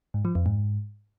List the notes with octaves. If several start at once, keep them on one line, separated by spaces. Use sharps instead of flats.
G#2
F3
F2
G#2